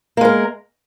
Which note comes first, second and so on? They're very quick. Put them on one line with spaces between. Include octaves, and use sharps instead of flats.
A#3 G#3 A#4